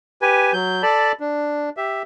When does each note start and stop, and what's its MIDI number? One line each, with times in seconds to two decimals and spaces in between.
0.22 0.53 67
0.22 0.53 71
0.22 0.53 80
0.53 0.82 54
0.53 0.82 91
0.83 1.12 69
0.83 1.12 74
0.83 1.12 81
0.83 1.12 83
1.20 1.69 62
1.77 2.02 67
1.77 2.02 76